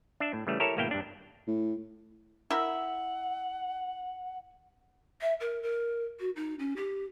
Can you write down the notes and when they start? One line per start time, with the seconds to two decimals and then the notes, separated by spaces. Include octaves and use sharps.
0.20 D4 E5
0.33 A2
0.47 C#3 E3 G3 A3
0.60 E4 G4 A4 A#4 C#5 E5
0.77 G#1 B2 A#3 E4 F5 G5
0.91 G2 D4
1.47 A2
2.50 E4 A#4 E5 F#5
5.22 E5
5.40 A#4
5.63 A#4
6.20 F#4
6.36 D#4
6.59 C#4
6.77 G4